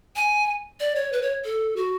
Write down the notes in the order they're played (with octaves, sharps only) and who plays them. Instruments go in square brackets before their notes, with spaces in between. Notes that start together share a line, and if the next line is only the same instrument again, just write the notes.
[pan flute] G#5
D5
C#5
B4
C#5
A4
F#4